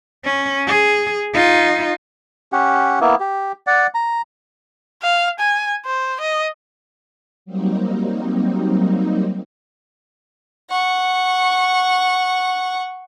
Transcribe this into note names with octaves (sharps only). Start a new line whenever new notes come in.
C#4
G#4
D#4 F4
C#4 G4 F#5
A#3 B3 E4
G4
D5 F#5
A#5
F5
G#5
C5
D#5
F#3 G3 A#3 C4 D#4
F#5 C#6